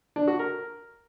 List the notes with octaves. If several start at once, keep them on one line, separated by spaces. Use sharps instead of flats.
D4
F#4
A#4